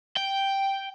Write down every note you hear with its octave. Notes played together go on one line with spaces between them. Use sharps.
G5